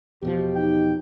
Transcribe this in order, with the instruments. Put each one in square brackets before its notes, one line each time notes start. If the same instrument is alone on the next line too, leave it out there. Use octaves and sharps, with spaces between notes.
[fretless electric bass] E2 B2 F3 [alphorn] G4
[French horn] D#4 [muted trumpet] G5